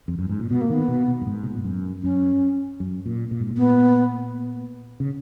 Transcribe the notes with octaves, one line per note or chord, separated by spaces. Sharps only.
F2
F#2
G#2
A#2
B2 B3
A#3
D#3 B3
B2
B2
F#2
G#2
B2
A#2
G#2
F#2
F#2 C#4
F#2
A#2
A#2
G#2
A#2
B3
C#3